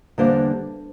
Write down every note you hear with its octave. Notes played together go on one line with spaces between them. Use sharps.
E2 D3 G3 A#3 D4 C5